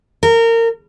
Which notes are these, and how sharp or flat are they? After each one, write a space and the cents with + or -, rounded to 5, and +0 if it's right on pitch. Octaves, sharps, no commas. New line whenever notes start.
A#4 -25